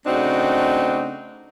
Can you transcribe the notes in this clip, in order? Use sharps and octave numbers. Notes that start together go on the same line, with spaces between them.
C#3 A3 C4 D4 D#4 F#4